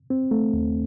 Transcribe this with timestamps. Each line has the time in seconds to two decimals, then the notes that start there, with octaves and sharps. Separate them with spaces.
0.10 C4
0.31 A3
0.53 D#2